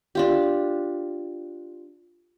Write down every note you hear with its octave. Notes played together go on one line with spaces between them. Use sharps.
D4 F4 G4